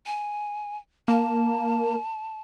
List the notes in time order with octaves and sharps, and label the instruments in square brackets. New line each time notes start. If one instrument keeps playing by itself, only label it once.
[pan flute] G#5
[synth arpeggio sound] A#3 [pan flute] A5